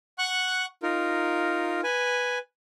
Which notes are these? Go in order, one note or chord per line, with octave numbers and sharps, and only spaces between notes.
F#5 C#6 F#6
D#4 F4 A#4
B4 G#5